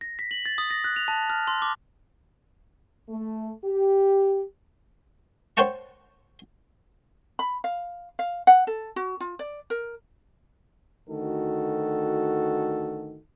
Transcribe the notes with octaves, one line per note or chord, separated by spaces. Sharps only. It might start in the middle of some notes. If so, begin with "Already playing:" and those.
A#6
B6
F#7
A6
D#6
A#6
F#6
F7
A5
F6
C6
D6
A3
G4
C5 C#5 F#5 G5 A5 C#6
B5
F5
F5
F#5
A4
F#4
F4
D5
A#4
D2 D#3 F#4 A4